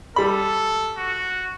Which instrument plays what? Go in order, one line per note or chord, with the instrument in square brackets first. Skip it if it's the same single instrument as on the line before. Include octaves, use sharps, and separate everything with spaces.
[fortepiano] G3 B5 [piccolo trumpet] A4
[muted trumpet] F#4